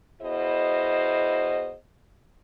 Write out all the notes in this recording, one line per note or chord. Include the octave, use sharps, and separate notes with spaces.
B2 E4 G#4 C5 D#5